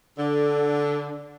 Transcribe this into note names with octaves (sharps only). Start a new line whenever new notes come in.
D3